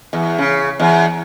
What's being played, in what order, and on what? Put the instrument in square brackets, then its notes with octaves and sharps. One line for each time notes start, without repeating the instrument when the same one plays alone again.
[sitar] E2
C#3
E2